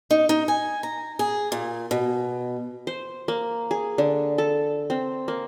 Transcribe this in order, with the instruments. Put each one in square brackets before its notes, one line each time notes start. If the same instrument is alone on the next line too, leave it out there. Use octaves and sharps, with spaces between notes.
[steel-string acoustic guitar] D#4
D#4
G#5
A#5
G#4
A#2
B2
[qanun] C5
A#3
G#4
D3
A4
C4
A#3